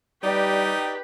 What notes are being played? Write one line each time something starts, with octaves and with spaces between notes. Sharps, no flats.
G3 D#4 G4 B4 D5 G5